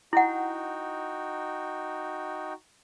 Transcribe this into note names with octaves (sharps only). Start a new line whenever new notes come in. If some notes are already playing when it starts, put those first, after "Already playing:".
D#4 E4 F#4 F#5 G5